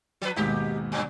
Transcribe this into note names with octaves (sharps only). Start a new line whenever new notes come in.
F3 B4
D#2 G#2 B2 D#4 G4
F#2 D3 F#3